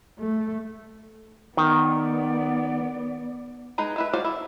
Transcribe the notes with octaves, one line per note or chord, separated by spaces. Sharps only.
A3
D#3 B3 D5
G#3 D#4 B4 A#5
G#3 E4 B4
G#3 F#4 C5 D5 F5
E4